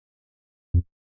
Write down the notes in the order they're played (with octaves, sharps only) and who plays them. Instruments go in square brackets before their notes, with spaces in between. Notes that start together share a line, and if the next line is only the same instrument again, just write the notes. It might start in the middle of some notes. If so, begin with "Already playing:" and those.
[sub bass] F2